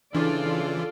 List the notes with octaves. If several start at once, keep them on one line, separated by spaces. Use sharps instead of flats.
C#3 E3 D4 E4 F4 A4 D5